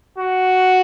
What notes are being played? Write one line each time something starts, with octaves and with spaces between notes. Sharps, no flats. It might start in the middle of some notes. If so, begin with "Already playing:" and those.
F#4